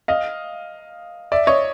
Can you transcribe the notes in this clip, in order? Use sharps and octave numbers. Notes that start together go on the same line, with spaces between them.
D#5 F5
D5 E5
C#5 D#5